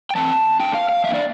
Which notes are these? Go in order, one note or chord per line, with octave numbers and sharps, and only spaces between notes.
G5
E3 A3 C4 A5
D3 A3 D4 G5
F5
F5
E3 A#3 D4 E5
D5